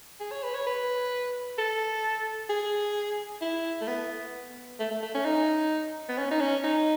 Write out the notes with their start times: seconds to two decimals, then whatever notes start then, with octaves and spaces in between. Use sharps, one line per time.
0.20 G#4
0.31 C#5
0.43 B4
0.54 C#5
0.66 B4
1.58 A4
2.49 G#4
3.41 E4
3.81 A3
3.87 B3
4.79 A3
4.91 A3
5.02 A3
5.14 C#4
5.25 D#4
6.08 B3
6.18 C#4
6.31 D#4
6.41 C#4
6.64 D#4